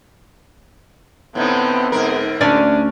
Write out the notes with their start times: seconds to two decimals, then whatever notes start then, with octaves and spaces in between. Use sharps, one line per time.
1.35 A2 D3 B3 C4 D#4
1.92 G#2 D3 A#4
2.41 D2 C#4 D4 D5